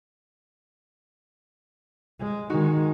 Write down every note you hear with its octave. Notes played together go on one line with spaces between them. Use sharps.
G#3
D#3 G#3 D#4 F#4